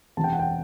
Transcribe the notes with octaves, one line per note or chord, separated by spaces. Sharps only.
E1 E2 C3 A5
G5
F#5
G5